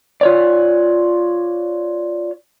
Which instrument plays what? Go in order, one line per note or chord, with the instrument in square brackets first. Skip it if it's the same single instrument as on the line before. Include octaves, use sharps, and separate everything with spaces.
[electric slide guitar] F4 C#5 D5